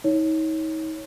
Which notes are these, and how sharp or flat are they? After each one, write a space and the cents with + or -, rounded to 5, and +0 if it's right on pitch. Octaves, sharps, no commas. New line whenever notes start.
D#4 +35 C#5 +0